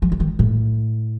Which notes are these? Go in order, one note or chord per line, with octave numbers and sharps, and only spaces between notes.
F3
E3
D#3
A2